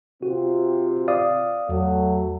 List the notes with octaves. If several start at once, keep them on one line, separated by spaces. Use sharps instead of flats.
C3 C4 F4 F#4
D5 F5 D#6
E2 F#3 A3